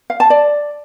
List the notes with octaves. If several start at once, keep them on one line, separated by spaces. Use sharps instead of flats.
F5
A5
D5